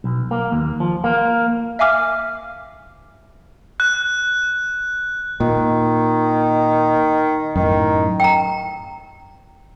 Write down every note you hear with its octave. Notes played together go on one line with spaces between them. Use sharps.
B1
A#3
D#2
F3
A#3
E5 F5 G#5 D6 F6
F#6
A#2 D#3
F#2 A2 D#3
G5 A#5